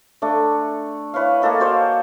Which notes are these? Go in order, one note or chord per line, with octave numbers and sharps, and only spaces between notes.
A3 D4
E4 B4 C#5 F5
A#3 G#4 A4 D#5
F#4 C5 D5 F5